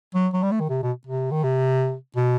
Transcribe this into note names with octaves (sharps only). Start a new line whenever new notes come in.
F#3
F#3
G3
A3
D#3
C3
B2
C3
D#3
C3
B2